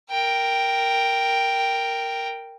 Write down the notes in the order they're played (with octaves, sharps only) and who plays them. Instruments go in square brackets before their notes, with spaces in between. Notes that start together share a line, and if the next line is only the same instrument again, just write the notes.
[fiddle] A#4 G5